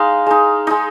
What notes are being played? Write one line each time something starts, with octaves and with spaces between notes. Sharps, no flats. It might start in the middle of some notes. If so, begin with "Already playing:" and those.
Already playing: G#3 D#4 F5
G#3 D#4
G#3 D#4